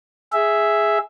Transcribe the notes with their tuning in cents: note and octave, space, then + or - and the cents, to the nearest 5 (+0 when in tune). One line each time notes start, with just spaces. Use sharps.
G#4 +0 E5 +0